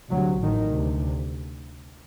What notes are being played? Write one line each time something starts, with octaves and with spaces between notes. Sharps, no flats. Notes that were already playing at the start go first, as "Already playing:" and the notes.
D2 C3 F#3
A1 A2 D#3
D2 C3